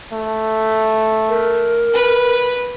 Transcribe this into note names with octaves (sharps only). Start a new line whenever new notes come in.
A3
A#4
B4